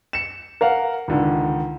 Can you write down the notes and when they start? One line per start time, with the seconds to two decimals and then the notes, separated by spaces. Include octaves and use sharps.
0.13 C#7 E7
0.61 A#4 F5 F#5
1.08 C#2 D3 D#3